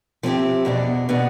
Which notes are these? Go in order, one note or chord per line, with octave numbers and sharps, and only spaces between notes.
F3 C4 E4 G4
E2 B2 B3 D4
B2 B3 D4